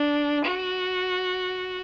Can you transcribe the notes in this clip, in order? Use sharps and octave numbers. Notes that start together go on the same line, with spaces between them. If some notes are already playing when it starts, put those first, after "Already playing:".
Already playing: D4
F#4